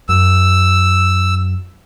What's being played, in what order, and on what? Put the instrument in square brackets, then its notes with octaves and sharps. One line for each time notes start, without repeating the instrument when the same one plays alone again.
[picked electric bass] F#2 [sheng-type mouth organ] E6